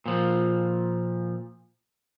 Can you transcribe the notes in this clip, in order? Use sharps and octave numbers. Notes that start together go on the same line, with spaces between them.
A#2 F3